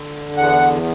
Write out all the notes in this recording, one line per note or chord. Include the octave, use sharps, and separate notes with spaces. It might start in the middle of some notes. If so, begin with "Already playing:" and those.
Already playing: D3
E2 F#5